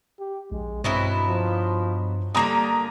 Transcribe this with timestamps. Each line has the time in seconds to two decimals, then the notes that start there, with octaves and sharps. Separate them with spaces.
0.19 G4
0.52 A#1 G#3
0.84 G2 B2 F#3 C4 E4
1.28 F3
2.35 D3 G3 A#3 C4 A#5 D#6